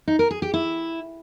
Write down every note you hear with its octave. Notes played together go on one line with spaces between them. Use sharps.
D#4
A#4
G#4
G4
E4